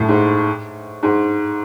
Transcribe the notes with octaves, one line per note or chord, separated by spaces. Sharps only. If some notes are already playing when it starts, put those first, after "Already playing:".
Already playing: A2
G#2
G#2